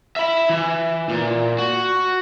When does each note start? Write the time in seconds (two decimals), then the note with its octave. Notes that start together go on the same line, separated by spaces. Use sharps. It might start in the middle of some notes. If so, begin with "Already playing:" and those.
0.16 E5 B5
0.50 E3
1.09 A#2
1.58 F#4